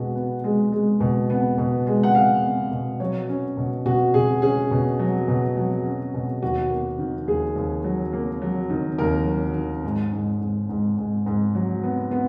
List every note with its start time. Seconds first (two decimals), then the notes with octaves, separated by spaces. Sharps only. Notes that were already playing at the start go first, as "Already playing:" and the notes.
Already playing: B2 G#3 F#4
0.16 B3
0.44 G#3
0.72 G#3
1.00 B2
1.30 B3
1.58 B2
1.87 G#3
2.04 F#5
2.14 G#3 F5
2.43 B3
2.71 B2
3.00 F#3 C#5
3.28 C#4
3.57 B2
3.85 B2 F#4
4.14 B2 G#4
4.42 C#4 G#4
4.71 B2
4.99 F#3
5.28 B2
5.57 F#3
5.85 C#4
6.14 B2
6.42 D#2 F#4
6.70 A#3
6.99 D#3
7.27 D#2 G#4
7.56 D#2
7.84 F#3
8.13 A#3
8.42 F#3
8.70 D#3
8.99 D#2 A#4
9.27 F#3
9.55 D#3
9.84 G#2
10.13 G#2
10.41 G#2
10.69 G#2
10.98 G#2
11.26 G#2
11.55 F#3
11.83 B3
12.11 B3